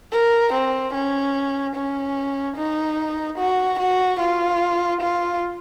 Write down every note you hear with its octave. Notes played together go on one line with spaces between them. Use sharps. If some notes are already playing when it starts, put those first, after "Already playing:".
A#4
C4
C#4
C#4
D#4
F#4
F#4
F4
F4